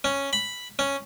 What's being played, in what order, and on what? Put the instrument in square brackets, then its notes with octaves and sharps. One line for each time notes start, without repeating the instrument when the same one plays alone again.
[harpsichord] C#4
B5
C#4